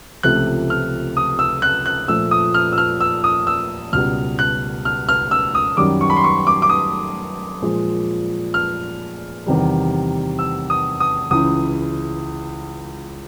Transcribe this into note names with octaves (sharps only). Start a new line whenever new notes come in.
C#2 C3 F3 A3 F#6
F6
D#6
E6
F#6
F#6
A#2 F3 A3 E6
D#6
F6
E6
F6
E6
D#6
E6
C#2 B2 G3 F6
F#6
F6
F6
E6
D#6
F#2 D#3 G3 D6
C#6
B5
C6
C#6
D6
D6
D#6
A#2 F3 G#3
F6
E2 C3 D#3 G3
E6
D#6
D#6
C#2 C#3 E3 D#6